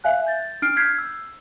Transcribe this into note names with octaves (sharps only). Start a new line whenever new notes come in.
E5 F5 G#5 F#6
G6 A6
D4 F6 C7 D7
F6 G6 G#6 B6 C7
E6